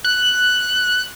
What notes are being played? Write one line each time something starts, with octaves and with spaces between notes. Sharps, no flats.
F#6